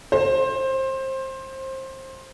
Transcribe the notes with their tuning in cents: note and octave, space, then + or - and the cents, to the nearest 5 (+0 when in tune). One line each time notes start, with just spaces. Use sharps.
C5 +20